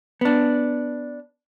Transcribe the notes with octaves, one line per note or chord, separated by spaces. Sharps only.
B3 D4